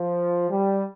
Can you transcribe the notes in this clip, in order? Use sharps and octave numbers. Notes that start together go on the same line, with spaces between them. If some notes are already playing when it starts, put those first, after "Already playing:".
Already playing: F3
G3